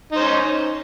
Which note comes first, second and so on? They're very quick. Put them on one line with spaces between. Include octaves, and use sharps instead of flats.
D#4 C5 C#4